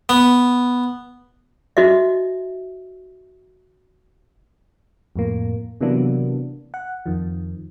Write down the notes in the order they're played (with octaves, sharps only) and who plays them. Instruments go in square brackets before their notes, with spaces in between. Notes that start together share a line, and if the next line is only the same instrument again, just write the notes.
[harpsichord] B3
[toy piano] D#4 F#4 D#5 E5
[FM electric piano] F2 A2 A#3
C3 E3 F#3 A#3 B3 D4
F#5
F2 D#3 F3